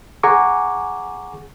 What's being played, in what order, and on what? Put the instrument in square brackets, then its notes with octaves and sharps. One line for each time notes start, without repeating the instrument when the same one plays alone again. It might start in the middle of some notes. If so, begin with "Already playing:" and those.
[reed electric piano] G#4 F#5 G#5 A#5 C#6 D6